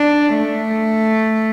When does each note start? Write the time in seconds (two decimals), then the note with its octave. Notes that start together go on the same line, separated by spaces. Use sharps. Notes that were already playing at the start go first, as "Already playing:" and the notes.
Already playing: D4
0.36 A3